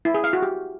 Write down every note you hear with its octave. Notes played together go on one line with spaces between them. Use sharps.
E4
G#4
F5
F#4
G4